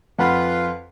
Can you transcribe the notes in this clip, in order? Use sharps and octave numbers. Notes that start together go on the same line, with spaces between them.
F2 F4 B4 F#5 B5